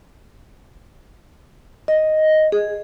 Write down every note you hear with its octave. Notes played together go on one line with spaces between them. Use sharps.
D#5
G#4